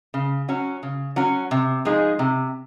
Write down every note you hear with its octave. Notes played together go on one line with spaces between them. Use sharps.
C#3
F#3 C#4 F#4
C#3
F#3 C#4 F#4
C3
F3 G#3 D#4 G#4
C3